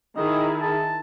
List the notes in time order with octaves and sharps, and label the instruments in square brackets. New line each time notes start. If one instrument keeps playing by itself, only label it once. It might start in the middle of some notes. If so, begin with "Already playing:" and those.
[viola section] D#3 E4 G#4 [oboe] D#5
[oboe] A5